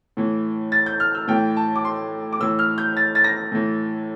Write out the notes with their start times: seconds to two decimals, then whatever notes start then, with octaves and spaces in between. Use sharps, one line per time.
0.17 A2 E3
0.72 A6
0.86 G6
1.00 F6
1.15 E6
1.28 A2 E3 G5
1.57 A5
1.76 D6
1.85 C6
2.33 D6
2.40 A2 E3 E6
2.59 F6
2.78 G6
2.97 A6
3.15 A6
3.24 A#6
3.52 A2 E3